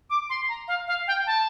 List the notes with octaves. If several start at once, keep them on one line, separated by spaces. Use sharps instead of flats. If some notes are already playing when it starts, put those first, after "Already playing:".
D6
C6
A#5
F5
F5
G5
A5